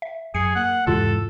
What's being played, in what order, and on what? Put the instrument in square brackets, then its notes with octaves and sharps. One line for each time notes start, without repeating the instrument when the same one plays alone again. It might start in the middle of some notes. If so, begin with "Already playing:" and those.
[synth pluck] E5
[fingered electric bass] F#2 [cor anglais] G#4 [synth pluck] C7 C#7
[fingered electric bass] A#3 [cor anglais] F#5
[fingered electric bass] E2 G#2 E3 [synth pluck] C3 F4 [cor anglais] A4